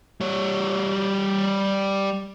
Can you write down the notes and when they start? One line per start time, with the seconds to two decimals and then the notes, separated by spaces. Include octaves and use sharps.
0.21 G3 C#5